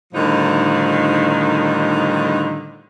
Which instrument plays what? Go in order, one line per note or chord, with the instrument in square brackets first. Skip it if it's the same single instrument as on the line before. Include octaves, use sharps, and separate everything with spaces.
[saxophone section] A2 D3 D#3 F3 G3 D#4